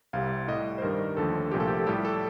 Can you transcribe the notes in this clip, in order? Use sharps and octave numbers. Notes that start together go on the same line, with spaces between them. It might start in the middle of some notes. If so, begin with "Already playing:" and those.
C2 C3 G3 F5
A2 G3 D#5
C5
G2 D#3 G3 A#4
D#2 D3 F3 A3 A4
C2 A#2 F3 A3 G4
A4
G4
A4
A2 G3 G4
A4